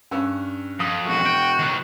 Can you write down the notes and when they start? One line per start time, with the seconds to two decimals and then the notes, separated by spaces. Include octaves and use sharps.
0.11 G2 C#4 E6
0.80 F2 D#6
1.06 E1 F#4
1.26 G5
1.59 D#3 F#3